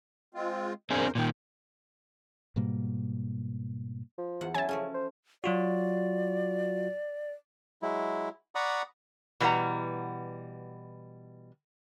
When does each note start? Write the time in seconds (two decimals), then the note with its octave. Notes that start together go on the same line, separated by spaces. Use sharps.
0.35 G#3 C4 F4
0.90 E2 C4 D4 G#4 A#4 C5
1.15 A#2 D#3 G5
2.56 G#2 B2 G3 A#3
4.18 F3
4.41 E2 F#5
4.54 F#3 C#4 E4 G#5 A5
4.69 C#3 F3 A3 C#4
4.94 C5
5.44 F#3 F4 F#4 D5
7.82 F#3 G#3 E4
8.55 D5 F#5 A#5 B5 C#6 D#6
9.40 B2 E3 G3 C5 F#5 A#5